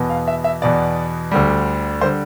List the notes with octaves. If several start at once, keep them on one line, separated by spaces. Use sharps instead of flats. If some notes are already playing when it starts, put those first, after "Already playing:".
Already playing: E2 B2 B3
F5
E5
E5
E2 B2 B3 D5
D2 D3 G3
D3 G3 C5